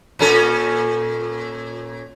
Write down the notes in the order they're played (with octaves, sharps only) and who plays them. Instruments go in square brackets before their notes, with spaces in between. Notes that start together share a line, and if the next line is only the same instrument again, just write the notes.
[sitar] A#2 C#4 A4